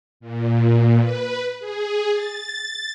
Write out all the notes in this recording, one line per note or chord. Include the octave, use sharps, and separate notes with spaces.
A#2
B4
G#4
A6